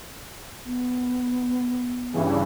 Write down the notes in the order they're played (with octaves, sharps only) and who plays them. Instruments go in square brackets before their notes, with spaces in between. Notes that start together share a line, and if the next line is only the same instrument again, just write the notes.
[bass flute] B3
[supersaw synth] G2 C#3 E3